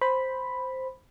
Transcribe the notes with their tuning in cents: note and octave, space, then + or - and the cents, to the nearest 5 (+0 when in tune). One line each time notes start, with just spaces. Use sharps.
C5 +0 B5 +0